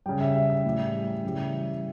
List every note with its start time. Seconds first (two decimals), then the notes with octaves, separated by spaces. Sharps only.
0.06 C#3 G3 G5
0.21 E5
0.36 E5
0.50 E5
0.65 A2 E3 G3
1.24 C#3 E3 G3